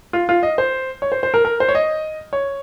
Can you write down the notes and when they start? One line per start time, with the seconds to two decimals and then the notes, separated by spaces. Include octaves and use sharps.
0.13 F4
0.29 F4
0.43 D#5
0.58 C5
1.02 C#5
1.12 C5
1.23 C5
1.34 A#4
1.45 A#4
1.60 C5
1.68 C#5
1.75 D#5
2.33 C#5